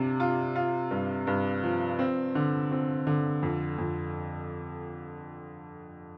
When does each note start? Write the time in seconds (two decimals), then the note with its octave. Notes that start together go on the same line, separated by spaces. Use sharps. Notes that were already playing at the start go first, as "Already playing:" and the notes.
Already playing: C3 D4 F4
0.20 F4
0.56 F4
0.91 G2
1.27 G2
1.64 F3
1.99 C4
2.35 D3
2.71 C4
3.07 D3
3.43 F2
3.78 F2